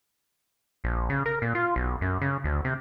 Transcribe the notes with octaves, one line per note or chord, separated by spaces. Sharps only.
A#1
C#3
A#4
A#2
F4
B1
F#2
C#3
D2
C3